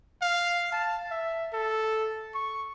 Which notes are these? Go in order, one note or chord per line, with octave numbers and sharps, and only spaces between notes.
F5
A5
E5
A4
C#6